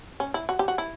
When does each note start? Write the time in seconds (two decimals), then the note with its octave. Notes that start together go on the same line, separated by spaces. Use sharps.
0.20 C#4
0.34 E4
0.49 F#4
0.59 G4
0.68 F#4
0.78 E4